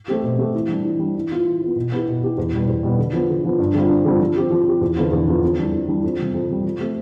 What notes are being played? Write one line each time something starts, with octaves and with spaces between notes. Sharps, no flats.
A3 C4 G4
B2
A3 C4 G4
E3
G3 D4
E3
G3 D4
E3
B3 F4
E3
B3 F4
B2
B3 E4 G4
B2
B3 E4 G4
E2
B2 G3 B3
E2
B2 G3 B3
D3
F3 B3
D3
F3 B3
G2
D3 G3 C4 F4
G2
D3 G3 C4 F4
F3
C4 G4
F3
C4 G4
E2
D3 F3 B3 F4
E2
D3 F3 B3 F4
F2
E3 G3 D4
F2
E3 G3 D4
F2
C3 G3
F2
C3 G3
F3
A3 C4 G4